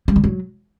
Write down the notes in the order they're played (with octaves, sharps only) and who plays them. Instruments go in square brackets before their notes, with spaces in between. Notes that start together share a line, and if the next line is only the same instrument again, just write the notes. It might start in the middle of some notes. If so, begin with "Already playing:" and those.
[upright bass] G3
D3
F#3